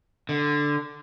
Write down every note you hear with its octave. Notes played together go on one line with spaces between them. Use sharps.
D3